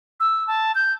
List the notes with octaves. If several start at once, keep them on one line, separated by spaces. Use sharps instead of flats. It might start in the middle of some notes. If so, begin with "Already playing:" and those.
E6
A5
G6